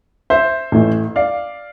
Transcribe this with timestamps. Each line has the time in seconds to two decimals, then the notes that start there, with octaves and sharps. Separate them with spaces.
0.30 C5 E5
0.72 A1 A2 E3 A3
1.16 D5 F5